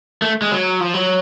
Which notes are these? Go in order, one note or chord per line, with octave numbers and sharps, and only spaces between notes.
A3
G#3
F#3
F3
F#3